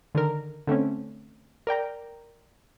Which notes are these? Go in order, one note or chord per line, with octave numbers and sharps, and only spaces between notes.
D3 D#3 A#4
D3 A3 C4 C#4
A#4 D5 G5 A#5